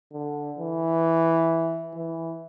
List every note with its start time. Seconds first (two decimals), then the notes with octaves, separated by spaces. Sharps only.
0.12 D3
0.58 E3
1.94 E3